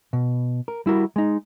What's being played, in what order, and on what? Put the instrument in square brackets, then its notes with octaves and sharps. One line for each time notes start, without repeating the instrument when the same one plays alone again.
[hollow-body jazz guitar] B2
A#4
G3 E4 F#4 A#4
G#3 D#4